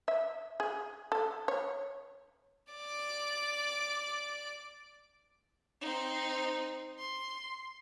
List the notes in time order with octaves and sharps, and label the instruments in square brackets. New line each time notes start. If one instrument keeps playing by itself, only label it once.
[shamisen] E5
G#4
A4
C#5
[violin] D5 D6
C4 D#4
C6